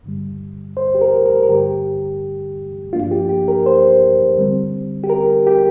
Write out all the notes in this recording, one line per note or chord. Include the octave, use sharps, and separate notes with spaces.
G2 D3 G3
C5
G4
A#4
A#4
A#4
G2 D3 G3 G4
G2 F3 A#3 D4 F4
G4
G4
A#4
C5
D3 G3 C4
G4
A#4
G4